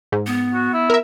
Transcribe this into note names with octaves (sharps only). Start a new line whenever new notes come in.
G#2
B3
F#4
E4
A#4 E5